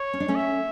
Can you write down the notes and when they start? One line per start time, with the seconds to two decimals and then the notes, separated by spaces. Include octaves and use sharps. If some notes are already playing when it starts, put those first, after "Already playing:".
Already playing: C#5
0.13 C#4
0.20 D4
0.28 A3 C#4
0.36 E5